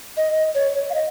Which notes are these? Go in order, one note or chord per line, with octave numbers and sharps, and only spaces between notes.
D#5
C#5
F5
D#5